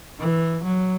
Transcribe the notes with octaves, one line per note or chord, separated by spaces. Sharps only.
E3
F#3